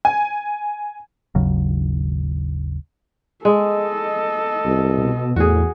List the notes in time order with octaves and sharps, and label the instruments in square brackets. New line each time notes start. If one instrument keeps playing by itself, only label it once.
[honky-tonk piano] G#5
[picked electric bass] G#1 D#2 C#3 F#3
[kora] G#3 [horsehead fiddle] A4 D#5
[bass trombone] C2
[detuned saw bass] B2
[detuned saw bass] E2 [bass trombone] A2 [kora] F#4 G#4